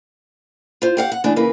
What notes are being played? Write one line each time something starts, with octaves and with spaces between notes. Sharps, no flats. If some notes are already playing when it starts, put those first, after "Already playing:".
F4 C5
G4 F5 F#5
F#5
D3 E3 A3 D4 G#4
C#3 E3 A#3 B4